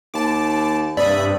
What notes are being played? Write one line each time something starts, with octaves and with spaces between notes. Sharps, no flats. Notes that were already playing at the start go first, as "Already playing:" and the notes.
D#2 A5 D6
G2 C3 D5 E5 B5 D#6